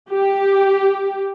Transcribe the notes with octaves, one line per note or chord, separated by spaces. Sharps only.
G4